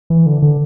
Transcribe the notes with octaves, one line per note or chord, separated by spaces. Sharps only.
E3
D3
D3